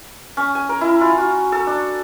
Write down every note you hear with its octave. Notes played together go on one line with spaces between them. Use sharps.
C#4
G#5
A#4
E4
F4
F#4
A4
D4